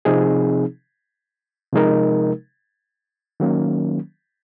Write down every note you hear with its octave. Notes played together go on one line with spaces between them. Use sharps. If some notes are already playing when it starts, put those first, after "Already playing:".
C3 F3 C4 D#4 G#4
C3 F3 G#3 D#4 A#4
D#3 F#3 A#3 C#4